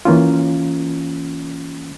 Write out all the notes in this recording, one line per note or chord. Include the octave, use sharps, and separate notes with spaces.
E3 A#3 C#4 F4